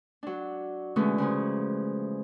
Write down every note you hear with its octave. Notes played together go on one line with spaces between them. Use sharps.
F#3 D4
B2 D3 E3 G#3 A3 C#4
C#3 E3 F3